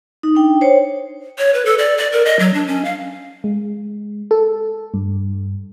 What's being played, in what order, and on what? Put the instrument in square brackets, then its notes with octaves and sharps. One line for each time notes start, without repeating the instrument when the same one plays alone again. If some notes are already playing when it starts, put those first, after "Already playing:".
[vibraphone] D#4
D4 G5
C5 C#5
[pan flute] C#5
B4
A4
D5
D5
A#4
D#5
F#3
D4
C#4
F5
[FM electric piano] G#3
A4
G2